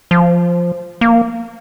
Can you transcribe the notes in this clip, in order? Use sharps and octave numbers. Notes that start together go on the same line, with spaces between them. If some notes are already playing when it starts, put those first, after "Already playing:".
F3
A#3